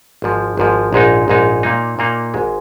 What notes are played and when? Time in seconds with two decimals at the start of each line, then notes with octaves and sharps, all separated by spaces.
0.22 G#1 G#2 F3
0.57 G#1 G#2 F3
0.93 A#1 G#2 G#3 D#4
1.28 A#1 G#2 G#3 D#4
1.63 A#2 A#3 D#4
1.99 A#2 A#3 D#4
2.34 G#1 G#2 G#3